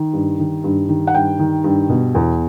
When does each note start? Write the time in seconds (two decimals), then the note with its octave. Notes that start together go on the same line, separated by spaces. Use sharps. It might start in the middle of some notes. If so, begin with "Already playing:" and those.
Already playing: D#3
0.13 G2
0.39 D#3
0.64 G2
0.89 D#3
1.07 F#5
1.14 G2 G5
1.39 D#3
1.64 G2
1.89 B2
2.15 E2